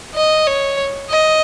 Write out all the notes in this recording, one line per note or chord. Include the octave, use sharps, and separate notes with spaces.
D#5
C#5
D#5